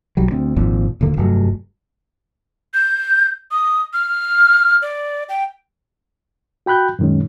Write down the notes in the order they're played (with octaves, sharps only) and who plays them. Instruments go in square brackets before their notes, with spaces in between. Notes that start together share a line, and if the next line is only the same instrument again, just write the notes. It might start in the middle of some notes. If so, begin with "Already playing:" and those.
[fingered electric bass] B1 F#3 G3
D2 C4
G#1 F2 A#2 F3
D#1 D2 D3 A#3
F1 G2 F#3 A3
[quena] G6
D#6
F6
D5
G5
[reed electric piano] F#4 G5 B5 F#6 G6
F#2 A#2 D#3 G#3 C#4